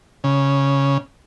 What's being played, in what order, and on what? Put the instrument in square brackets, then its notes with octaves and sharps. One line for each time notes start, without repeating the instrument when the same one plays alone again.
[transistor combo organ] C#3